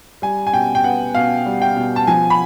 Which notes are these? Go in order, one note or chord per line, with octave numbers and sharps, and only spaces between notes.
G3 G#5
G#5
B2 G5
G5
B3 F#5
B2 F5
G3
G5
B2
A5
F3 G#5
B5